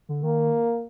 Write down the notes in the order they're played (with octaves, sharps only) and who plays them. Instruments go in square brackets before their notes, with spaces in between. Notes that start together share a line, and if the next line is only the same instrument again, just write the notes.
[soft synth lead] D3
[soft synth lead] D#3 [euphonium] A#3